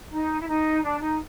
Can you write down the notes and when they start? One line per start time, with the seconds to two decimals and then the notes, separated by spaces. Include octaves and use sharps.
0.11 D#4
0.39 E4
0.47 D#4
0.83 D4
1.01 D#4